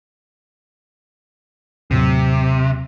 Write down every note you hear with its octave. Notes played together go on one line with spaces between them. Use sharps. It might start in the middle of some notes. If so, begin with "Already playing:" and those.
D#2 A2 C3 F#3